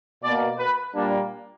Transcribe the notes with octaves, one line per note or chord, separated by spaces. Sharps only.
B2 A#3 D5
B4
A#2 G3 A#3 D4